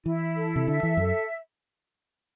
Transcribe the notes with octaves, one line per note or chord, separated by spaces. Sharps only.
E3 E4
A4
C3
D3 E5
E3
F#2 A4